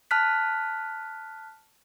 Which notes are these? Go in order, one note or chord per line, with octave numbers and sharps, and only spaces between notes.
A5 F6 F#6 B6